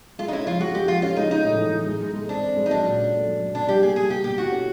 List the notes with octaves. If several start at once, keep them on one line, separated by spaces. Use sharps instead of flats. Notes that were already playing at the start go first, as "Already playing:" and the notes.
G#3 F4
D#4
C#4 E4
F3 F4
G#3 F#4
G#3 G4
F3 F4
C#4 F4
G#3 D#4
C#4 D#4
A2
E3
E3
G#3
G#3
G#3
C4 D4
C4
G#3
D#4
F#3 D4
A#2
C#4
A3
F#3
A3
B2 D4
G3 G4
A#3 G#4
G3 G#4
A#3 G4
B2 G4
E4 F#4
C#4